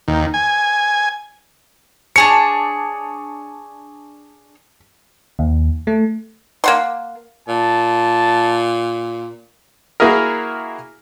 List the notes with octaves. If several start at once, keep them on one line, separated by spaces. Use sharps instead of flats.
D#2
G#5
D4 G#4 C#5 C#7
D#2
A3
A#3 F#5 C6
A#2 A5
A#3 E4 F#4 G#4 A#4